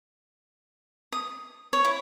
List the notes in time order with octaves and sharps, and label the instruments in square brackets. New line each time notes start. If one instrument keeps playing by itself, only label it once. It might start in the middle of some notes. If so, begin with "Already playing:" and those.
[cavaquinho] D#6
C#5
E4